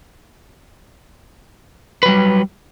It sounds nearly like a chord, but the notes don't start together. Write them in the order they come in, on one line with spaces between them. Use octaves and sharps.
B4 F#3 G3